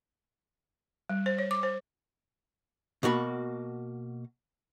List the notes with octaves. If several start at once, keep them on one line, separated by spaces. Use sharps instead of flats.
G3
C5
C#5
D6
C5
B2 A#3 F#4 B5